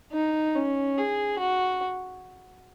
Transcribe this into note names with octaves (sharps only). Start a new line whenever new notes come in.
D#4
C#4
G#4
F#4